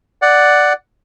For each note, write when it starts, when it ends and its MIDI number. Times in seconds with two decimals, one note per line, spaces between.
0.22 0.73 74
0.22 0.73 78